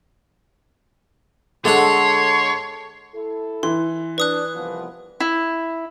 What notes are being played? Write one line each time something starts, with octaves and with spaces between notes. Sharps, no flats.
D3 G#3 A4 C#5 F#5 C6
E4 A4
E3 C6
D4 B4 D#6 F#6
C2 F3 B3
E4